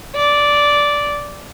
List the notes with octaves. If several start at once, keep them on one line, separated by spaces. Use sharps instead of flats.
D5